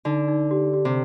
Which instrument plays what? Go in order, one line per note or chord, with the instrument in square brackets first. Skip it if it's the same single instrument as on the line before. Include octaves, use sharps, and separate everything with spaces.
[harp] D3 [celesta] D#4
[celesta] D#4
G4
G4
[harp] C3